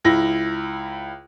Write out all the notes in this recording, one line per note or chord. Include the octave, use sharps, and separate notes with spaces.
C#2 E4 A#6